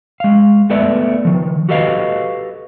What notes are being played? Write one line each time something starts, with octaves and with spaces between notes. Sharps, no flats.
G#3 F5
A3 B3 A4 B4 D5 E5
D#3 F3
F#4 G4 A4 B4 D#5 F5